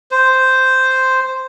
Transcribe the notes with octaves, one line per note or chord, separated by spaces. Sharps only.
C5